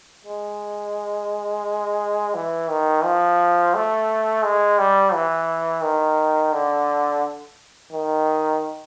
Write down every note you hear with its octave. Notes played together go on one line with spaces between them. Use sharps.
G#3
E3
D#3
F3
A3
G#3
G3
E3
D#3
D3
D#3